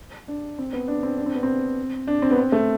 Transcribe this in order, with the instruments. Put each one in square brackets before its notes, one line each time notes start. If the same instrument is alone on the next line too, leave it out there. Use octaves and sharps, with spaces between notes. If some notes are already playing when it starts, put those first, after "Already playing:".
[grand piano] D4
C4
B3
D4
C4
D4
C4
B3
C4
D4
C4
B3
C4
A3